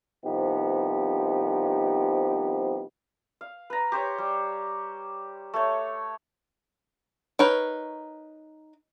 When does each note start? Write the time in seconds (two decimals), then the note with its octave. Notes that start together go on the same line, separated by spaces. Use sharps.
0.25 C2 C3 F3 B3 D#4 G4
3.41 F5
3.70 B4 A#5
3.92 G4 C5 C#5
4.18 G3
5.54 A3 C#5
7.39 D#4 A#4 B4 C#5